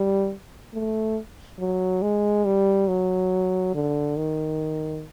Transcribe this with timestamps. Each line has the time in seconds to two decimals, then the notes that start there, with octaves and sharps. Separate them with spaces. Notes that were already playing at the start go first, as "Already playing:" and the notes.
Already playing: G3
0.74 A3
1.59 F#3
2.02 G#3
2.45 G3
2.88 F#3
3.75 D3
4.17 D#3